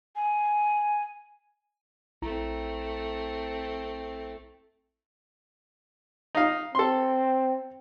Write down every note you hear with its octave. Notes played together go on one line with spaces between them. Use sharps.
G#5
A#1 A3 C4 E4 A#5
D#4 F5
C4 A4 C6